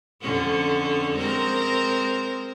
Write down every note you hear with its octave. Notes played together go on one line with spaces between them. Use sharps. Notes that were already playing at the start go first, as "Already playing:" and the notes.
F2 D3 C#4
G#3 C4 A#4